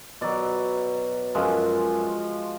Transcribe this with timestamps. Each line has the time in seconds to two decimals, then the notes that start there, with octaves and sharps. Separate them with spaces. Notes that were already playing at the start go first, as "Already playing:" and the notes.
0.21 B2 F#3 D5
1.35 F#2 F3 G#3